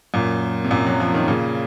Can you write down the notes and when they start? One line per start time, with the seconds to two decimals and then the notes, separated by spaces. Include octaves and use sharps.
0.14 F#2 A#2
0.64 C3
0.70 F#2 A#2
0.87 F#3
1.00 F3
1.14 D#3
1.28 A#2 C#3